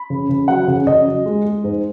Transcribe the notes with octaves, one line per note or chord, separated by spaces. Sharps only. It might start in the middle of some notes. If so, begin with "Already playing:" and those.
Already playing: B5
C#3
C#3
F#3 F#5
C#3
C#3 D#5
F#3
G#3
G#3
G#2